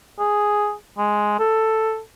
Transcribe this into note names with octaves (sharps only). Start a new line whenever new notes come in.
G#4
G#3
A4